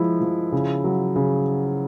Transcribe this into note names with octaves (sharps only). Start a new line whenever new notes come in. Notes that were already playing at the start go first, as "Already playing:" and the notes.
Already playing: F3 G#3 E4
F3
C#3
F#3
C#3